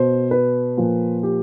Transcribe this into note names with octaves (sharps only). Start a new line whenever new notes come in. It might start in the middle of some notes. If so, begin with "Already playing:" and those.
Already playing: B2 C5
B4
A#2 F3
G4